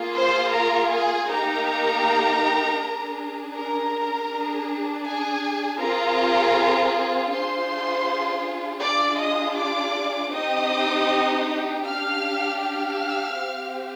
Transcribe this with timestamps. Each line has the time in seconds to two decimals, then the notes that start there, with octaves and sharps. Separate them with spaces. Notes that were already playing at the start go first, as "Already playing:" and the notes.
Already playing: A#3 F4 G#4
0.14 C5 C6
0.51 A#4 A#5
0.89 G#4 G#5
1.27 A#3 D#4 G4 A#4 A#5
2.78 D4 G#4
3.53 A#4 A#5
4.29 D4 G#4
5.04 G#4 G#5
5.80 C4 F4 G#4 A#4 A#5
7.30 D4 F4 G#4 C5 C6
8.81 D4 F4 G#4 D5 D6
9.19 D#5 D#6
9.57 D5 D6
10.32 C4 D#4 G4 D#5 D#6
11.83 D4 G4 F5 F6
12.59 F5 F6
13.35 C4 G4